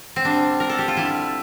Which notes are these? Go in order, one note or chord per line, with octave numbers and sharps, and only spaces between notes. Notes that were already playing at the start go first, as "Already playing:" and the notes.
C4
D3 G3 D4
A#4
A4
G4
F4
D3 G3 E4